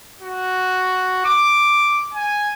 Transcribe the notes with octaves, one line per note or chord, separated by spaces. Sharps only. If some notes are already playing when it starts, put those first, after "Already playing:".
F#4
D6
G#5